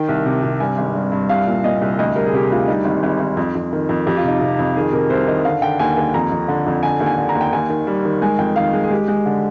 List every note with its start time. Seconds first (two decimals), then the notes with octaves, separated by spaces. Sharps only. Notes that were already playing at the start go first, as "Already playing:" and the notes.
Already playing: D#3 G5
0.08 C2
0.26 C3
0.43 C3
0.60 G2 G#5
0.78 G#1
0.95 G2
1.12 G2
1.29 C2 F5
1.47 A#2
1.64 A#2 D#5
1.82 C2
1.98 D2 D#5
2.15 G3 A#4
2.26 G#4
2.33 C3 G4
2.50 D2 F4
2.68 G3 D#4
2.85 G#1
3.03 G#1
3.20 G#1
3.37 F2
3.55 F2
3.72 D#3
3.89 F2
4.06 F2 G4
4.17 F4
4.24 C3 D#4
4.39 C3 F4
4.59 F2
4.76 D#3 G#4
4.92 C3 A#4
5.10 C2 C5
5.27 D#3 D#5
5.45 D3 F5
5.62 D3 G5
5.79 D#2 G#5
5.97 D#2 G#5
6.14 F2 A#5
6.31 F2
6.48 D3
6.66 F2
6.83 D3 G#5
7.00 D#2
7.06 G#5
7.18 D3
7.29 A#5
7.35 D#2
7.41 G5
7.53 D#2 G#5
7.70 D#3
7.87 G3
8.05 D#3
8.22 G#3 G#5
8.38 F2 G5
8.56 D#3 F5
8.73 G#3 G#4
8.84 G#4
8.90 G#3 G4
9.08 G#3
9.25 D3